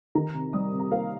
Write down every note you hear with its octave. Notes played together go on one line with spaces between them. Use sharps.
D#3 A#5
C3
G3 D#6
C3
A#5
A#3 F5